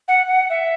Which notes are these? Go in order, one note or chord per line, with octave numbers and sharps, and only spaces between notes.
F#5
F#5
E5